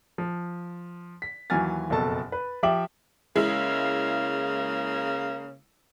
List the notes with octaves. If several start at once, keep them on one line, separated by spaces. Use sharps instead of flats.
F3
B6
D#2 E3 F#3 G#5 F6 A6
F#1 F2 B2 A4 A5 A6
B4
F3 G4 E5 G5 D6 F#7
C#3 G#3 A#3 E4 F5